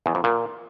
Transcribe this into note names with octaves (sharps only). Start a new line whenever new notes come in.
E2
F2
A#2